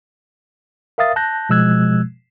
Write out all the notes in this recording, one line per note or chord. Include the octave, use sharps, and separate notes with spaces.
A#4 E5 F5 D#6 A6
A5 F#6 G6 A#6
B2 F3 G#3 E6 F#6 G#6